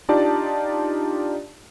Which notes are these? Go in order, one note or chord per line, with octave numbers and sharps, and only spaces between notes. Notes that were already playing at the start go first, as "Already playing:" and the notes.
D4 D#4 F4 G4 D5 A5